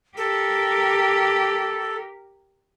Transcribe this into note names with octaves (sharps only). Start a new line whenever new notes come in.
G4 A4 A#4